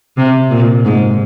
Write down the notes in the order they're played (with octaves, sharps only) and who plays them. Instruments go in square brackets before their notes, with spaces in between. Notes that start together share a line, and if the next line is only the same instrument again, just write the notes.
[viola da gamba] C3
A#2
G#2